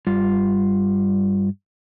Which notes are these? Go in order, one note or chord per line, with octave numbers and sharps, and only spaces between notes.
G2 G3 F4